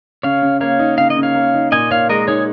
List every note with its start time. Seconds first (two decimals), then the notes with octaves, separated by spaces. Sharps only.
0.23 C#3 C#5 F5
0.42 C#3
0.61 A#3 C#5 F5
0.79 D#4
0.98 C#3 F5
1.10 D#5
1.17 C#3
1.23 C#5 F5
1.35 A#3
1.54 D#4
1.72 A#2 D#5 G#5
1.91 A#2 C#5 F5
2.09 G#3 A#4 D#5
2.28 D#4 G#4 C#5